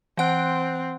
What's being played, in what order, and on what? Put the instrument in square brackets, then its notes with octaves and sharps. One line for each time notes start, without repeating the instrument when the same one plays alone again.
[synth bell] E3 F#5 F#6 [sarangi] C4